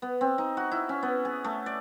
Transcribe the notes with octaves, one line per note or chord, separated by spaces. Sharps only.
B3
C4
D#4
F#4
E4
C#4
B3
G#4
A3
D5